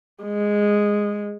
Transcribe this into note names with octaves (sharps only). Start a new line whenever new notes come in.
G#3